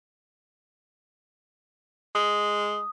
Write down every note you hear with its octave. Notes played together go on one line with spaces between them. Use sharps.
G#3 D#6